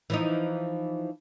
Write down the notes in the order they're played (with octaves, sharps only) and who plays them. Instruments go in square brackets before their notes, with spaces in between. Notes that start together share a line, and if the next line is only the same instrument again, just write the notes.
[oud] E3 F3 D#4